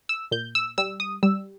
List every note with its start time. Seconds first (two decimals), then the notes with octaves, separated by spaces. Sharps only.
0.09 E6
0.31 A#2 G6
0.55 E6
0.78 G3 E6
1.00 D#6
1.23 G3 E6